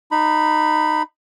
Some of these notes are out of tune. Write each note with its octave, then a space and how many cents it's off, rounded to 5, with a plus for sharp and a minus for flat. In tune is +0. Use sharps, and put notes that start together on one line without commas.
D#4 -20 B5 +0